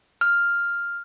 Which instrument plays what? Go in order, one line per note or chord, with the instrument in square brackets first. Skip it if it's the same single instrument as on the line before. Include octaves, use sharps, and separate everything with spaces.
[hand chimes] F6